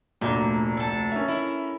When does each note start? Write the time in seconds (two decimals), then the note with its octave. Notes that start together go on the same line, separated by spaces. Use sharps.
0.21 F1 D2 A#2
0.77 A4 A5
1.12 C#4 A#4 E5
1.28 E4